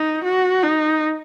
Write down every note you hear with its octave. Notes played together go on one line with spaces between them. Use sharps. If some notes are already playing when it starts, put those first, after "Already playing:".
Already playing: D#4
F#4
D#4